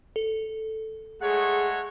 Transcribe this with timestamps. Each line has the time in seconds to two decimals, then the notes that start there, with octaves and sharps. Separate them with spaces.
0.16 A4
1.21 G#3 A3 G#4 C#5 F#5